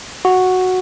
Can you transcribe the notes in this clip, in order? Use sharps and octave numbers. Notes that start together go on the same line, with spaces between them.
F#4